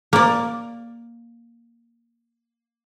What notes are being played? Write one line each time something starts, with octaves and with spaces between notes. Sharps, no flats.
A#3 D5